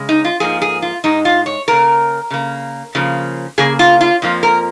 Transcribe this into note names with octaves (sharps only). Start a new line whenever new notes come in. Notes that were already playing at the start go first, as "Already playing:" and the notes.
Already playing: C#3 G#3
D#4
F4
G#2 F3 A#3 G#4
G#4
F4
G#2 G#3 D#4
F4
C#5
C#3 A#3 A#4
C#3 A#3
C#3 F3 A#3
C#3 A#3 G#4
F4
F4
F2 F3 A#3
A#4